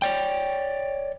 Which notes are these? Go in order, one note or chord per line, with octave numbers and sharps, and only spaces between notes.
C#5 D5 G5